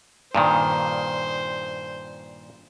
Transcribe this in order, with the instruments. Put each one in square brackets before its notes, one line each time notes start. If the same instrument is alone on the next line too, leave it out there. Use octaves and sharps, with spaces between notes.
[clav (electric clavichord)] G2 A#2 D#3 [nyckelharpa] C5